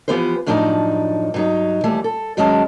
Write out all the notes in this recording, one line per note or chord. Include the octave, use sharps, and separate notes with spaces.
E3 F3 B3 G4 B4 C5
F#2 A2 F3 D4 D#4 A#5
G2 F#3 D#4
D#2 E3 G3 A3
A4
G2 D#3 F#3 G#3 C#4 A5